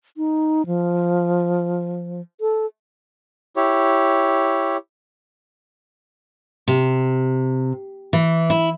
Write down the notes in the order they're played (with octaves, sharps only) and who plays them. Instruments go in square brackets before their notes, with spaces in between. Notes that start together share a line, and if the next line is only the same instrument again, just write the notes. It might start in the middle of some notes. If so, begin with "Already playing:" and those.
[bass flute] D#4
F3
A4
[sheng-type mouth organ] E4 G4 C#5
[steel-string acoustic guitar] C3
E3
E4